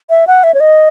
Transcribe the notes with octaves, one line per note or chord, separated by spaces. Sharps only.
E5
F#5
E5
C#5
D#5